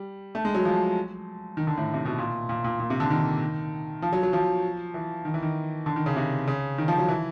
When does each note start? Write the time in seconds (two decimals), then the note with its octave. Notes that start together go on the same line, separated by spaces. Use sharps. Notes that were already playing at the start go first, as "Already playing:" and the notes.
Already playing: G3
0.35 A3
0.45 G#3
0.55 F#3
0.65 F3
1.57 D#3
1.67 D3
1.77 A2
1.94 C3
2.05 B2
2.18 A#2
2.49 A#2
2.64 A#2
2.80 A#2
2.90 C3
3.00 D3
3.10 D#3
4.02 F3
4.12 F#3
4.23 F#3
4.33 F3
4.94 E3
5.25 D#3
5.34 E3
5.42 D#3
5.86 D3
5.96 D#3
6.06 C#3
6.16 C3
6.47 C#3
6.78 D#3
6.88 F3
6.98 F#3
7.08 E3